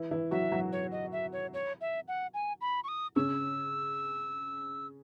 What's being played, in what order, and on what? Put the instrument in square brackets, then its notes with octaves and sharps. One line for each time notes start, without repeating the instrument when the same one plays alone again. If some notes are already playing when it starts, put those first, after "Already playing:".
Already playing: [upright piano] E3 E4
E3 E4
[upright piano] F#3 F#4 [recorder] E5
[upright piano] F#3 F#4
[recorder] C#5
D#5
E5
C#5
C#5
E5
F#5
G#5
B5
C#6
D#6
[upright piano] C#3 C#4 [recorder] E6